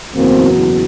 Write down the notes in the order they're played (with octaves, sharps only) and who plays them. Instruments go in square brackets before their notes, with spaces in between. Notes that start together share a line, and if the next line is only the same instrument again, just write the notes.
[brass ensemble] F#1 E2 B2 F#3 A#3 C4